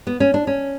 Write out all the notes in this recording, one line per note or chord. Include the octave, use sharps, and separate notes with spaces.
B3
C#4
D4
C#4